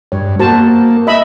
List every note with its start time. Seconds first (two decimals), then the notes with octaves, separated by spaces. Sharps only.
0.12 G2 C#5
0.39 A#3 F#4 C5 A5
1.07 D#5 E5 B5